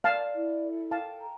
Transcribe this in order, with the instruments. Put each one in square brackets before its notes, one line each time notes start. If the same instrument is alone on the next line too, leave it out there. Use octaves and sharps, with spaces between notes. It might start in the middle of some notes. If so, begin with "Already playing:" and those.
[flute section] D5 [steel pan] F5 A5
[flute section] E4
A4
[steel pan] F5 A5 [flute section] G5
[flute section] A#5